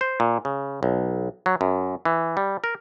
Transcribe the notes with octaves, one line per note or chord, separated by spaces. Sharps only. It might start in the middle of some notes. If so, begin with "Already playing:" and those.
C5
A#2
C#3
B1
F#3
F#2
E3
G3
A#4